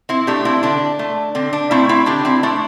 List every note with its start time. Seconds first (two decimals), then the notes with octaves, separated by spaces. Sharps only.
0.09 C4 E4
0.27 A3 D4 G4
0.45 C4 E4
0.63 D3 D4
0.99 A3
1.35 D3 C4
1.53 D4
1.71 A3 C4 E4
1.89 C4 E4
2.06 D3 D4 G4
2.25 C4 E4
2.43 A3 D4